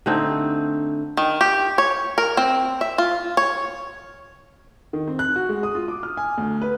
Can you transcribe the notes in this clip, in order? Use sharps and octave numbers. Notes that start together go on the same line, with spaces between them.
D3 A3 C4 D#4
D#3
G4
C#5
A#4
C4
E5
F4
C#5
D#3
C4
F#6
F#4
G#3
D#6
F4
D6
F6
G#5
D2
B4